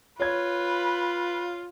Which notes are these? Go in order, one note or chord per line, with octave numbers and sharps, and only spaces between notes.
F4 B4 C#5 G#6